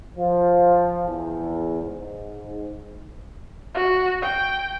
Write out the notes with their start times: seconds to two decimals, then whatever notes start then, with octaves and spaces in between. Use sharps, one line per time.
0.16 F3
1.06 E2
1.81 G#2
3.75 F#4
4.22 G5